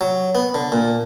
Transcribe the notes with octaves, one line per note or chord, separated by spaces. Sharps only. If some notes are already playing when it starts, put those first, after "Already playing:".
F#3
B3
D3
A#2